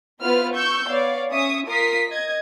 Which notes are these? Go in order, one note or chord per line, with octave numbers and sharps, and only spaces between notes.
B3 E4 F4 B4 C5 F6
C#6 E6 G6
B3 C#5 D5 F5
C#4 E5 C#6 D#6
F4 A#4 D#6 B6 C7
D#5 G#6